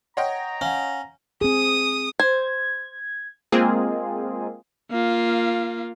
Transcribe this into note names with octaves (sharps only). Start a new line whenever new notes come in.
C#5 D#5 F#5 G5 A#5
C#4 F5 F#5
C4 G#4 D#6
C5 G#6
G#3 A#3 C4 F4 G#4
A#3 F4